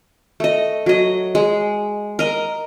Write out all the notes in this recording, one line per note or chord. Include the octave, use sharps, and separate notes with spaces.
A3 D#5
F#3 D#5
G#3
A#4 D#5